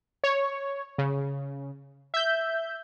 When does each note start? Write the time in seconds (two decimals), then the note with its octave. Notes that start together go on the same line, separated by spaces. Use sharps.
0.24 C#5
0.98 C#3
2.14 E5 G6